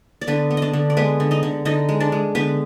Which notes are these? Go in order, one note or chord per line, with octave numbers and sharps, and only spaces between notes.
D5
D3 B3 B4
B3
D4 D5 D#5
D3
D5
G#3 B3 B4
D3
D#4 D#5
D3
D3 D#4 D#5
G#3
D4 D5
G#3
D3 B3 B4